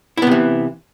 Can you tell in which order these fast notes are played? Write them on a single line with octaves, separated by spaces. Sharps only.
E4 B3 C3 E3